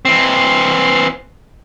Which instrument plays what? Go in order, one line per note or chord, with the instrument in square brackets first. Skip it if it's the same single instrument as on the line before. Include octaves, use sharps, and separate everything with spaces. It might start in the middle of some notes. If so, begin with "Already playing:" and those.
[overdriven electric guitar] E3 C4